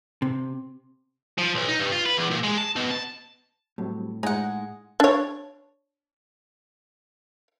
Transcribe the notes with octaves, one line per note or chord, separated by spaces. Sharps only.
C3
F3
B1
D#4
G2
F4
B4
E2
A#2
G#3
A5
B2
A5
A2 F#3 G3 C4
G#3 D#4 F#5 G#5
D4 C#5